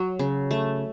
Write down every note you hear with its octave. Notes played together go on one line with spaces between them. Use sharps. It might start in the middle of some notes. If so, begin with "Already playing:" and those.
Already playing: F#3
C#3
A3